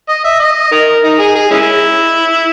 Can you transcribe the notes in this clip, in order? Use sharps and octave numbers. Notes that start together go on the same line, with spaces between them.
D#5
E5
D#5
D#4 A#4
D#4
G#4
G#4
G#3 C#4 E4